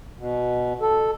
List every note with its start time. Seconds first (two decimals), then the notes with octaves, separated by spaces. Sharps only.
0.18 B2
0.81 A4